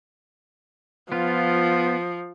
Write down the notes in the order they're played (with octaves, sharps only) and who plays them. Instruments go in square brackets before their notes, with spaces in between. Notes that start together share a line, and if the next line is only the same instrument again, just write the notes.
[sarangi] F3 [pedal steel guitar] B3 F4